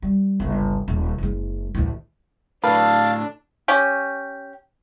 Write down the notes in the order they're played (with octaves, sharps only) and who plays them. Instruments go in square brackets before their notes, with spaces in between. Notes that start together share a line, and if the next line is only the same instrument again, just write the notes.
[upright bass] G3
G1 C#2
D#1
F#1 G#3
A1 D2
[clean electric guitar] A2 D3 [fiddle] D4 [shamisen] B4 [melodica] F5 A5
[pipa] C#4 G4